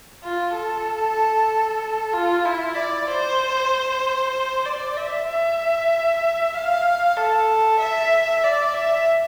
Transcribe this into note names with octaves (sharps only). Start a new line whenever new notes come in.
F4
A4
F4
E4
D5
C5
D5
E5
E5
F5
A4
E5
D5
E5